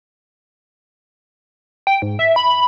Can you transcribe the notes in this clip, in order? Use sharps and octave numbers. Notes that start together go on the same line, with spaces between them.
G5
G#2
E5
B5